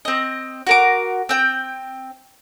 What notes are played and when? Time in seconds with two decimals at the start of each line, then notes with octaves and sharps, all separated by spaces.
0.05 C4 D#5
0.67 F#4 A#4 D6
1.29 C4 G5